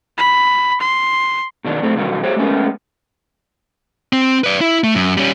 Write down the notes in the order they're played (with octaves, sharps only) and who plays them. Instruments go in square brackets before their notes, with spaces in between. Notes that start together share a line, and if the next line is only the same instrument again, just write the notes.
[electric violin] B5
C6
[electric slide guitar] B2 D#3 D4
A2 A3 C4
B2 D3 D#3 F#3 G3
G4 C5 C#5
G#3 A3 B3 C#4 A#4
[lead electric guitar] C4
B4 D5
E4
A3
F#2
G3 C#4